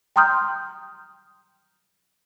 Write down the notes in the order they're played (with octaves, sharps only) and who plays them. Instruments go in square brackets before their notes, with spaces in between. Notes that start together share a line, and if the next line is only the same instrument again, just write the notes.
[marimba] G5 A#5 C6 D#6 F6 G6